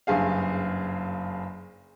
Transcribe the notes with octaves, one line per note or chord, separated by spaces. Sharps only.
F#1 G2 G#4 F5